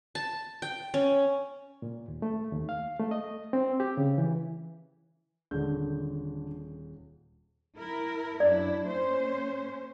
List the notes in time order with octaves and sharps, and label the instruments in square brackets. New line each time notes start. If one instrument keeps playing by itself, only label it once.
[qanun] A5
G5
C#4
[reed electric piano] A#2
D#2
A3
D#2
F5
A3
D#5
C4
G4
C#3
E3
[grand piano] D#1 G#3 G6 [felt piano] D3
[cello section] E4 A#4
[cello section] F#2 D4 E4 [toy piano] D5
[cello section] A#3 C#4 C5